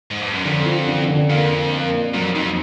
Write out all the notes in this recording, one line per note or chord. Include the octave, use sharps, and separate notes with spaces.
G#2
G2
F#2
F2 D3
F3
D3
D3
F2 A#3
A#3
A#3
A#2
F2 F#3
F2 D#4